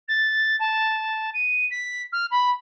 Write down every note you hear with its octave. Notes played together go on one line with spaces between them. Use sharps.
A6
A5
D#7
B6
F6
B5